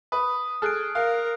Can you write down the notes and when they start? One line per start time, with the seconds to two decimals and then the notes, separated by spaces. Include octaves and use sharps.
0.12 B4 D#6
0.62 G#4 A4 F6 F#6 D7
0.95 A#4 F5 F#6